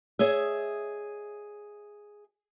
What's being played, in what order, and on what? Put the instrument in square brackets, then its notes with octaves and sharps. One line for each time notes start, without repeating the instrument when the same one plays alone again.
[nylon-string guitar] G#4 C#5 D#5 E5